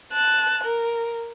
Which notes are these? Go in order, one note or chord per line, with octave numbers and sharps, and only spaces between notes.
A5 F#6
A#4